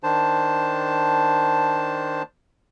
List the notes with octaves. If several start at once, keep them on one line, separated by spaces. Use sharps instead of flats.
D#3 D4 C5 A5